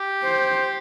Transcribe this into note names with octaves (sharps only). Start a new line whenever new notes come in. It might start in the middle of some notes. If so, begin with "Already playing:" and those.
Already playing: G4
C5